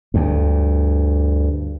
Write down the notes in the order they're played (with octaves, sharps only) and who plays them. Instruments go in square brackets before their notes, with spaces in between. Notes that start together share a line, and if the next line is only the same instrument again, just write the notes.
[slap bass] D2 G2